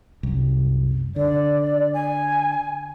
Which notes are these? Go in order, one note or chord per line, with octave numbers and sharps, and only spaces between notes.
C2 F#2
D3 D5
G#5